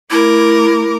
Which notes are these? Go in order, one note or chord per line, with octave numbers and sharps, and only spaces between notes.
A3 E4 A#4 D6